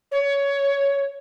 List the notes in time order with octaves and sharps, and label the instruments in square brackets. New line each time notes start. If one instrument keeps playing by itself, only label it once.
[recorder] C#5